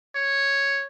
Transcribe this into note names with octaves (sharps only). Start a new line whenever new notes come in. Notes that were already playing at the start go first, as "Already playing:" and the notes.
C#5